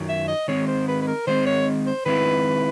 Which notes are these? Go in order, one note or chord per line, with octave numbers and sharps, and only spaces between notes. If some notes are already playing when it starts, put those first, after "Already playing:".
Already playing: F#2 D#3 F#3
E5
D#5
D#3 G#3 C4 C#5
C5
B4
B4
A#4
D#3 G#3 C4 C5
C#5
C5
D#3 G#3 C4 E4 B4